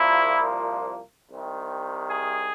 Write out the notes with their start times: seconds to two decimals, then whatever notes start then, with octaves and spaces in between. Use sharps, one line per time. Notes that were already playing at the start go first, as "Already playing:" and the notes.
Already playing: C2 A#2 F3 A#3 E4
1.31 C2 C3 D#3
2.09 G#4